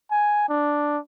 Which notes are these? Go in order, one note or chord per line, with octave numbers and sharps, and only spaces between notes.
G#5
D4